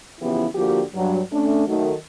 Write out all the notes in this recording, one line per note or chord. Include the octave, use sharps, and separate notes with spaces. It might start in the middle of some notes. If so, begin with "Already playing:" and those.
C#3 E3 F3 B3 E4 G4
D3 F3 A#3 F#4 G4
G2 F#3
A3 C#4 D4
D#3 F#3 A3